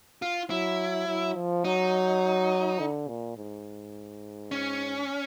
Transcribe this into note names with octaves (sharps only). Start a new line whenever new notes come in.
F4
F#3 E4
F#3
F3
F#3 D#4
D3
A#2
G#2
C#4